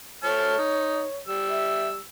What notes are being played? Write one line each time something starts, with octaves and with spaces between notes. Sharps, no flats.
A3 C#5 A5 F6
D#4
G3 E6
E5